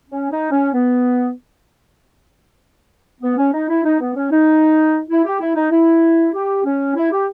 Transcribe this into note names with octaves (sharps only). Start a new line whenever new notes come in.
C#4
D#4
C#4
B3
B3
C#4
D#4
E4
D#4
B3
C#4
D#4
E4
G4
E4
D#4
E4
G4
C#4
E4
G4